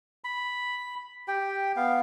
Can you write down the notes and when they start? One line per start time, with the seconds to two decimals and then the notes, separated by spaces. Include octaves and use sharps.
0.24 B5
1.28 G4 G5
1.76 B3 F5